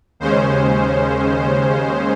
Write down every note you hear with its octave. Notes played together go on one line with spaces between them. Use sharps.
D#2 C#3 G#3 C#4 C5